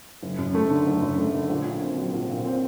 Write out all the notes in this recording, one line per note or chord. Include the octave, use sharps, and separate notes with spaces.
F#1
F#2
A3
D3
F#1
F#2
A3
D3
A#1
A#2
C4
F#3
A#1
A#2
C4